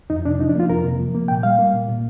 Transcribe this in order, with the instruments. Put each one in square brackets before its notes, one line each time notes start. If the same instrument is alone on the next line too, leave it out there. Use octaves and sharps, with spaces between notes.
[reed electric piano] F2 D#4
C3 D4
F3 D#4
D4
A#3 F4
F2 A#4
C3
F3
A#3
A#2 G5
G3 F5
A#3
A#2
A#2